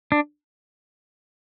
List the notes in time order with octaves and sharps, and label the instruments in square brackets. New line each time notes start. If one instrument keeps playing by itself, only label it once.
[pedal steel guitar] D4